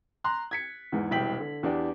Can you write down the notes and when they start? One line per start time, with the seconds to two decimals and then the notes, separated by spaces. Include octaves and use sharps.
0.24 A#5 C6 F#6
0.51 G#6 B6 C#7
0.92 E2 G#2
1.11 E1 C2 G5 B6 F#7
1.40 D3
1.63 E2 D4 G4